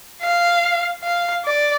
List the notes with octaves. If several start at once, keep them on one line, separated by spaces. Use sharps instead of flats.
F5
F5
D5